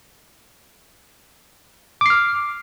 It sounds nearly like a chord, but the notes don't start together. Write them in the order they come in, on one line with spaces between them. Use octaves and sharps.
D6 C7 F6